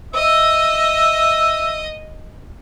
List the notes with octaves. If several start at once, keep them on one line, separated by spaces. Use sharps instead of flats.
D#5 E5